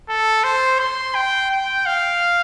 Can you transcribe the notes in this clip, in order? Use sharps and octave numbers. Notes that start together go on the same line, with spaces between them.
A4
C5
C6
G5
G5
F5